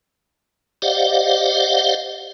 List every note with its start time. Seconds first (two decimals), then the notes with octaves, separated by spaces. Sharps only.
0.82 G4 C5 D5 D#5 F5 F#5